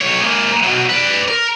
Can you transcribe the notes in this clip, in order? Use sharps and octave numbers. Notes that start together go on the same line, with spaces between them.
B1 C#5
G#3 A#3
B2 F#3
B4 D5
A#4